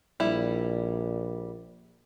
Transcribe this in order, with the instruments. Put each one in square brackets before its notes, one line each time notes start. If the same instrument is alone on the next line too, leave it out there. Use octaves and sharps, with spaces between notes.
[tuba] A#1 [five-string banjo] G3 E4